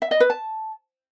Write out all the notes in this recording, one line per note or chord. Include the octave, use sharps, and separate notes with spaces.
E5
D#5
B4
A5